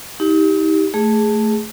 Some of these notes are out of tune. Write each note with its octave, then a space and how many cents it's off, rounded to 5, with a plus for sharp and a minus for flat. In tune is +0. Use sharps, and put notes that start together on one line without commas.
D#4 +40 G4 +0
A3 +0 G#4 +0